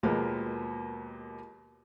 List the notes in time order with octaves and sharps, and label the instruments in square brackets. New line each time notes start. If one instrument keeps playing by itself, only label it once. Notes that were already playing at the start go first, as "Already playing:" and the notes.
[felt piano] D#2 B2 F3 G#3 A#3 B3